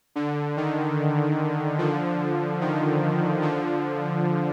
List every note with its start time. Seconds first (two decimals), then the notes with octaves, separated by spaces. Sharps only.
0.15 D3
0.57 D#3
1.78 D3 F3
2.61 D#3
3.42 D3 F3